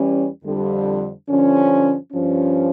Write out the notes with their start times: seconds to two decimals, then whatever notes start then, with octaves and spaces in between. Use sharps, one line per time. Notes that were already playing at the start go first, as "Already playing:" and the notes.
Already playing: E2 E3 G3 C#4
0.44 F2 D3 G3
1.29 G2 D3 F3 C#4
2.12 G2 F3 C#4